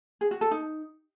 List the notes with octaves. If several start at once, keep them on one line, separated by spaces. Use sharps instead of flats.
G#4
F#4
A4
D#4